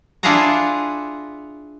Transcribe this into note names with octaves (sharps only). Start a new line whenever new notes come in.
D4 E4 F4 G#4 F#5 A#5